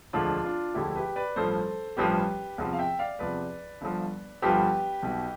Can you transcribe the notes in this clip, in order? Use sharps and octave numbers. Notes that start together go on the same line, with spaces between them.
E1 D2 D3 F3 D4 F4
D4 F4
E1 D2 D3 F3 E4 G4
G4 B4
B4 D5
A1 G2 F3 A4 C5
A1 G2 F3 G4 B4
E2 C3 F3
F5
E5 G5
D5 F5
E2 C3 F3 B4 D5
G1 G2 F3
G1 G2 F3 G4 B4
B1 B2